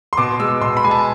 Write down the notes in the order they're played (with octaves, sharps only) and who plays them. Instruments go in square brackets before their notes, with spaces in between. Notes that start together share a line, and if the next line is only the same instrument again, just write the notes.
[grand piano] C6
B2 D6
G#3 E6
B2 C6
B5
G#3 G#5
A5